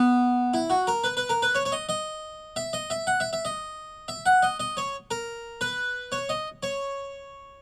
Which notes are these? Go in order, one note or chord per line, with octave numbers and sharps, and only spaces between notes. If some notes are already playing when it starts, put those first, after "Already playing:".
Already playing: B3
E4
F#4
A#4
B4
B4
A#4
B4
C#5
C#5
D#5
D#5
E5
D#5
E5
F#5
E5
E5
D#5
E5
F#5
D#5
D#5
C#5
A#4
B4
C#5
D#5
C#5